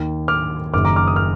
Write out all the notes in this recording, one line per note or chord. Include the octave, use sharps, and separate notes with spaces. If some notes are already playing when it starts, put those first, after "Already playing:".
Already playing: D#2 D#3
D6 F6
F#1 F#2 D#3 D6 F6
A#5 D6
D6 F6
D#6
F6